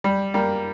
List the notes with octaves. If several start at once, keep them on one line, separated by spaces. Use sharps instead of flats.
G3
G3 A#3